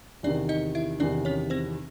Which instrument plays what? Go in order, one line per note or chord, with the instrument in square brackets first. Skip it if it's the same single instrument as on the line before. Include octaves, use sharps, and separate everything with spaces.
[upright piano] E2 C3 D#3 [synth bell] D4 D5
[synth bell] D#4 D#5
E4 E5
[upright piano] E2 C3 D#3 [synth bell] D4 D5
[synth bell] C#4 C#5
C4 C5